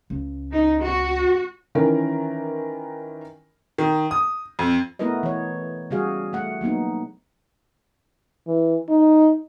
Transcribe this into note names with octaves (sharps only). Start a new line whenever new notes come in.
C#2
D#4
F#4
D#3 E3 C#4 A#4
D#3
D#6
F2
A3 B3 E4 A#4 B4 D#5
E3 C#5
C#3 G3 F#4 G#4 F5
A3 F#5
F#3 A#3 B3 D#4
E3
D#4